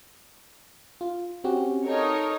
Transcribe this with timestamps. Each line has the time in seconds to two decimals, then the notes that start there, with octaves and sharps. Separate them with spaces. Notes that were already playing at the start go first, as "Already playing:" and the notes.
1.01 F4
1.44 C4 C#4 F#4 G4
1.85 D#4 A4 A#4 C#5